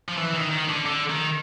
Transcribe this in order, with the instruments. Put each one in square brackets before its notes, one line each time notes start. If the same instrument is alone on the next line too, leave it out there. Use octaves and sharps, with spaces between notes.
[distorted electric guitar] F3
E3
D#3
D#3
D3
D3
D#3